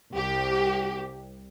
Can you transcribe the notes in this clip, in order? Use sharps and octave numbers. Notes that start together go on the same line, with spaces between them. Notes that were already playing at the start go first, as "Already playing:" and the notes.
C2 G4